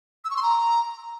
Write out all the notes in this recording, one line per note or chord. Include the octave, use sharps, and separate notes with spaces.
E6
C#6
C6
A#5